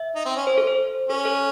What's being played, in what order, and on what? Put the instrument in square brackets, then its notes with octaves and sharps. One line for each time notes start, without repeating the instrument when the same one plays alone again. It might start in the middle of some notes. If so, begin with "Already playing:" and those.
Already playing: [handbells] E5
[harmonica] D#4
C4
C#4
[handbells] C5
A4
C5
[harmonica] C#4 [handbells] A4
[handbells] A4 C#5